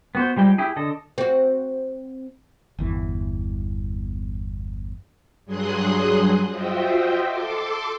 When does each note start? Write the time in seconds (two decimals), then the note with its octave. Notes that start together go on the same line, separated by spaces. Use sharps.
0.15 B3 F#4 C5
0.36 F3 G3 G#3 G5
0.58 E4 G4 G#4
0.76 D3 A4 D#5
1.18 C4 F#4
2.79 G1 E2 E3
5.45 G2 F#3 G#4 C6 D#6 F#6
6.49 F4 F#4 C5 D#5 E5 G5
7.26 A4 C6 D6